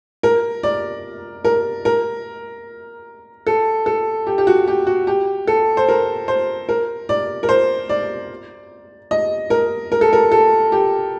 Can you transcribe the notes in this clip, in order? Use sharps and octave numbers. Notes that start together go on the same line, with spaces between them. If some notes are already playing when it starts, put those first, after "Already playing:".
A#4
D5
A#4
A#4
A4
A4
G4
G4
F#4
G4
F#4
G4
A4
C5
A#4
C5
A#4
D5
A#4
C5
D5
D#5
A#4
A#4
A4
A#4
A4
G4